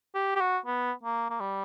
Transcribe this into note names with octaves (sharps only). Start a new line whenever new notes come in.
G4
G4
F#4
B3
A#3
A#3
G3